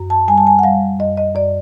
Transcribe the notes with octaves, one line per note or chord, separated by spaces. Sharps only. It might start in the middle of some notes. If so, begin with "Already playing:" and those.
Already playing: F#2
A5
G3 G#5
A5
G#5
F#5
G3 F5
F#2 D#5
D#5
F#2 D5